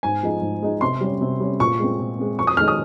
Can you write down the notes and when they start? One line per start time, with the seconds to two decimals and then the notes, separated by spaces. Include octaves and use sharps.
0.03 G#2 G#5
0.23 F3 G#3 D#4
0.42 G#2
0.62 F3 G#3 D#4
0.81 C3 C6
1.01 G3 C#4
1.21 C3
1.40 G3 C#4
1.60 A#2 C#6
1.79 G#3 C4
1.99 A#2
2.19 G#3 C4
2.39 F2 C#6
2.47 D#6
2.57 D#3 G#3 D#4 F6
2.68 D#6